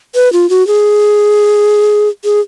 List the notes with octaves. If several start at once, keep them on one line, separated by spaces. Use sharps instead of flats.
B4
F4
F#4
G#4
G#4